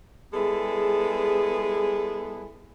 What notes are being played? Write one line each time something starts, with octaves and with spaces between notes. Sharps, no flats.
G3 G#3 B3 E4 G#4 A4